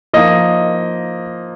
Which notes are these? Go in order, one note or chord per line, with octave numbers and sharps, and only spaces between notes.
F3 A#3 D#4 D#5